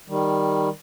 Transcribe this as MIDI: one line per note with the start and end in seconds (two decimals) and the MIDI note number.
0.08 0.69 51
0.08 0.69 55